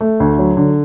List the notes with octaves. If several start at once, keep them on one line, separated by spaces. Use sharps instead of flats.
A3
D2
F#3
D3